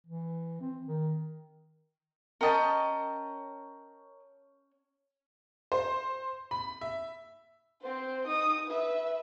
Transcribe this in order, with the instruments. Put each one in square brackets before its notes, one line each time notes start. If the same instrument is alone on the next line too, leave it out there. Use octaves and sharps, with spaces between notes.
[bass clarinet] E3
C4
D#3
[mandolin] C#4 G5 A5 [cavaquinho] A#4 D#5
[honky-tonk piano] C5
B5
E5
[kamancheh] C4 C5
D#4 D#6
B4 E5